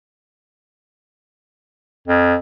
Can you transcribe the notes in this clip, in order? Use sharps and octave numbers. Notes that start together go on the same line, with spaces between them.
F2